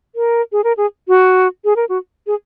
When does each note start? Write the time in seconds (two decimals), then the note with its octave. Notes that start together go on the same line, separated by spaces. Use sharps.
0.15 A#4
0.52 G#4
0.64 A#4
0.77 G#4
1.08 F#4
1.65 G#4
1.76 A#4
1.89 F#4
2.27 G#4